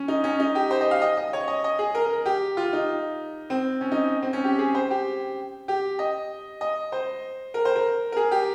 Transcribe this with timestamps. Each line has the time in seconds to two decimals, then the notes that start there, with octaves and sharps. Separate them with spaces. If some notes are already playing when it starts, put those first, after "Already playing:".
Already playing: C#4
0.08 D#4
0.24 C#4
0.40 D#4
0.55 G4
0.71 C5
0.81 D#5
0.91 F5
1.02 D#5
1.17 D#5
1.33 C#5
1.48 D#5
1.64 D#5
1.79 G#4
1.95 A#4
2.05 A#4
2.26 G4
2.57 F4
2.73 D#4
3.50 C4
3.81 C#4
3.92 D#4
4.22 C4
4.33 C#4
4.44 G4
4.59 G#4
4.75 C5
4.90 G4
5.68 G4
5.99 D#5
6.61 D#5
6.92 C5
7.54 A#4
7.65 C5
7.76 A#4
8.12 A#4
8.17 G#4
8.31 G4